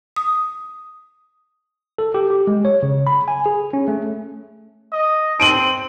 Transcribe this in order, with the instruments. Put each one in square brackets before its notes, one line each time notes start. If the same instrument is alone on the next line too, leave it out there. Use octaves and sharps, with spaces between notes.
[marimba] D#6
[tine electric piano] A4
G4
G4
G#3
C#5
C#3
B5
G#5
G#4
C#4
A3
[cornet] D#5
[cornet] C4 [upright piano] D7 D#7 F#7